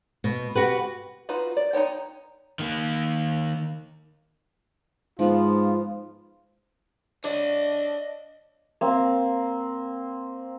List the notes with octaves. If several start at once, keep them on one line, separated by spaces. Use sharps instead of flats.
B2
F#4 G4 B4
D#4 F4 F#4 B4
D5
D#4 E4 C#5 G5
D#3 A#3
G#2 F3 B3 F4
D4 C#5 D#5
A#3 C4